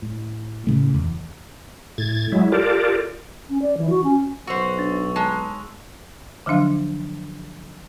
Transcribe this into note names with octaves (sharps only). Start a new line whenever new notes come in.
A2
A2 C#3 A3
D#1 E2
A2 G#6 A6
F#3 G#3 E4
F4 G4 A4 A#4 D5
C#4
D5
E3
F#4
C#4
B1 F#4 C5 C#6 E6 F7
D4 A6
G#3 A5 A#5
D3 F3 F#3 D4 F5